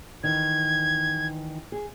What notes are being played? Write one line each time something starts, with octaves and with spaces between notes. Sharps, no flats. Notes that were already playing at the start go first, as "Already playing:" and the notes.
D#3 E3 G#6
G#4